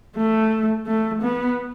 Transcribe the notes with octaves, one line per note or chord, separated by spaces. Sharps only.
A3
A3
B3